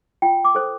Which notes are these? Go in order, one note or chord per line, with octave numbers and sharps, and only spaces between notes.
F4 G5
D6
A4 C5